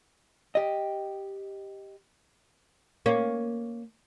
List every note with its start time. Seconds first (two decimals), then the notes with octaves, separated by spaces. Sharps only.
0.55 G4 D#5
3.06 A#3 C#4